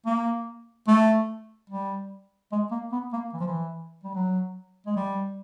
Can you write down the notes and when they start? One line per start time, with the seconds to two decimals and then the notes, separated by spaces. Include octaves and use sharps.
0.06 A#3
0.88 A3
1.70 G3
2.52 G#3
2.71 A#3
2.92 B3
3.13 A#3
3.33 E3
3.40 F3
3.47 E3
4.03 G3
4.15 F#3
4.86 G#3
4.97 G3